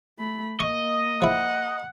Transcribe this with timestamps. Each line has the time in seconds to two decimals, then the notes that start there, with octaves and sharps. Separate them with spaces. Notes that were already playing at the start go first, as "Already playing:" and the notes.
0.18 A3 B5
0.60 A#3 D#5 C#6
1.22 F3 E4 F#5